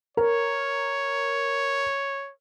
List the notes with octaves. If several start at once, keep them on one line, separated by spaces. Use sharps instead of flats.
A#4 C#5